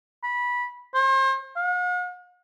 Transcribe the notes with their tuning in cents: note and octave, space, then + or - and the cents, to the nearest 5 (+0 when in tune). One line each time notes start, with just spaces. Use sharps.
B5 -15
C5 +35
F#5 -45